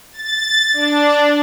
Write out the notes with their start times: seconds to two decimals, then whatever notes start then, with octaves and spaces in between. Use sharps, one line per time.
0.12 A6
0.73 D4